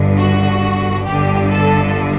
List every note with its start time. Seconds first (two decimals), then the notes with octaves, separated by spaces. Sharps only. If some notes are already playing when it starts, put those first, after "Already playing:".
Already playing: G1 G2 D3
0.17 F#4
1.06 G1 G2 D3 G4
1.50 A4